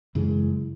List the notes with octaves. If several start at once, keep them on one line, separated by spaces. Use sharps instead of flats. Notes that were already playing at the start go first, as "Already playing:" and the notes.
F#2 C#3 E3 G#3